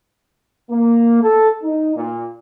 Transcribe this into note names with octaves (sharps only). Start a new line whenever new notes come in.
A#3
A4
D#4
A#2